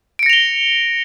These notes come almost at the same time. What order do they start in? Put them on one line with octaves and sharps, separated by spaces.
D7 C#7 A#6 F7 G7